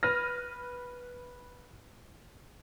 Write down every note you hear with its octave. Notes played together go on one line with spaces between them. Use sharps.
B4 F6 A#6